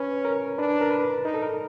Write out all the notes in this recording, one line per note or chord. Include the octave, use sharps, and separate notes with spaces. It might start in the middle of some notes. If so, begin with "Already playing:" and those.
Already playing: C#4 B4
A#4
D4 B4
A#4
B4
D#4 A#4
A4
A#4